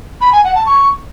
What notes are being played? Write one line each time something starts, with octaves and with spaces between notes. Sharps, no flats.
B5
G#5
F#5
A5
C#6